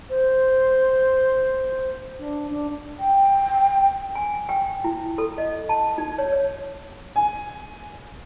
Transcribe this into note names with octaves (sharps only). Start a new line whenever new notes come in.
C5
D4
D4
G5
G#5
G5
E4
A4
D#5
A5
D#4
C#5
C#5
G#5